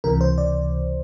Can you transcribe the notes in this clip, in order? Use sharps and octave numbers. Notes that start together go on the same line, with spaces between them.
C#2 C3 E3 A#4
C5
D5